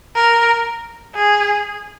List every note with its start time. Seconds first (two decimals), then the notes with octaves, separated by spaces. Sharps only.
0.16 A#4
1.16 G#4